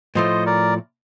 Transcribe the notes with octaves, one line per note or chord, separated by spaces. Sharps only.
A2 F3 A3 C5 D#5
A#4 D5